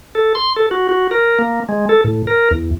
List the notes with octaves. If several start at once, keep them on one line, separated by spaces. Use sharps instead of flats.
A4
C6
A4
F#4
F#4
A#4
A#3
G#3
A4
A2
A#4
E2